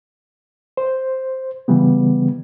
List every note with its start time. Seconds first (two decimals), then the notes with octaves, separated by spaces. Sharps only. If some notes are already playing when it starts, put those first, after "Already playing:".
0.77 C5
1.68 C#3 E3 G3 B3